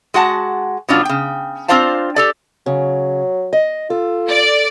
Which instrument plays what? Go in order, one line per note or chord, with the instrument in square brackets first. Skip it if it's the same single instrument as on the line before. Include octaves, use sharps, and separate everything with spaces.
[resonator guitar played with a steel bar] G#3 F#4 F#5 A5
B2 F3 F#3 C#4 D4 F4
C#3 G5
C4 D4 F4 C5 F5 A5
G4 A4 D5
[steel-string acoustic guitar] C#3 [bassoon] F#3
[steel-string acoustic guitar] D#5
[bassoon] F4 [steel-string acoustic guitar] A4
[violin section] D5